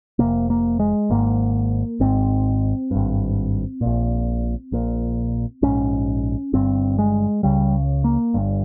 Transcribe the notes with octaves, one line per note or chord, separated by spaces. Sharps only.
F1 F2 C3 A#3
A#3
G#3
G#1 G#2 A#3
G#1 G#2 C4
G#1 G2
A#1 A#2
A#1 A#2
A#1 G#2 C#4
G1 G2 C4
G#3
C#2 C#3 G3
A#3
G1 G2